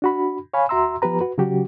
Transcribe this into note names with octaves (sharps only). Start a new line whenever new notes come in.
D4 F#4 B5
C#5 F5 G#5 B5
D#2 F#4 E5 A#5 C6 E6
F3 B3 G4 B4 A#5
F#4 B4
C#3 F#3 C#4 F#4 G4